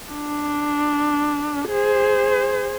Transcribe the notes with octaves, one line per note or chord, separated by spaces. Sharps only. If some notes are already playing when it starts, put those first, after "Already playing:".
D4
G#4 C5